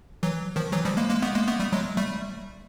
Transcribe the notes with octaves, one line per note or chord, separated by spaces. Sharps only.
E3 F#3
D#3 F3
E3 F#3
F3 G3
G#3 A#3
G#3 A#3
A3 B3
G#3 A#3
A3 B3
G3 A3
F#3 G#3
G3 A3